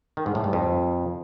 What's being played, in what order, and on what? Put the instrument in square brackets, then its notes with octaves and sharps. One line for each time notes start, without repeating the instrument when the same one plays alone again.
[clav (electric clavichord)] D#3
G#2
A2
G2
F2